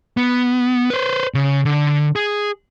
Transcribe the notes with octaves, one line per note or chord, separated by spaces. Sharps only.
B3
B4 C5
C#3
D3
G#4